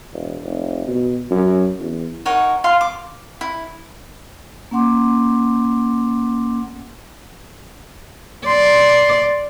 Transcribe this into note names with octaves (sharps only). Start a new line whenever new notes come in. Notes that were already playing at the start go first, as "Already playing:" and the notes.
E1
F1
B2
F#2
E2
D#4 A#4 C#5 F#5
F4 F5 C6
D6
E4
A#3 C#4 F#5 C6 D6
D5 C6